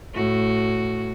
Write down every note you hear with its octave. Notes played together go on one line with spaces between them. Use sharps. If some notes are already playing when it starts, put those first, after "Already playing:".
A2 F#4